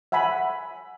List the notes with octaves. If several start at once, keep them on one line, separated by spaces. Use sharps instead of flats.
E5 F#5 G#5 B5